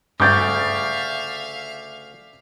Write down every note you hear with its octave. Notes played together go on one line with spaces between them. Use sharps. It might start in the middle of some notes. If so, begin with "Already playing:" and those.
D2 G2 C#3 E5 F5 D6 G6 A6